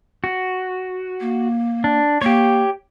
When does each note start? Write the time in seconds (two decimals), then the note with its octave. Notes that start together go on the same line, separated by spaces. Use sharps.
0.24 F#4
1.20 A#3
1.84 D4
2.22 A#3 G4 C#5